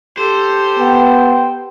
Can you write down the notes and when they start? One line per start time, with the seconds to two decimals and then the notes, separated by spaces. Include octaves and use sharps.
0.17 G4 A4 C5
0.79 B3 G5